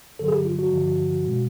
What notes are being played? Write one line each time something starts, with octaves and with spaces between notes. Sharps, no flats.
G2 D3 F#3 A4
G#4
G4
F4
F#4
G2 D3 F3
B2 G#3